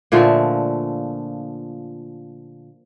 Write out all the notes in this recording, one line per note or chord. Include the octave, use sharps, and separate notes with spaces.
A#2 D3 F3 A3